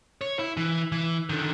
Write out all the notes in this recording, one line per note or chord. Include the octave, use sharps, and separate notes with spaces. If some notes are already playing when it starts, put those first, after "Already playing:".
C#5
E4
E3
E3
D3 D#3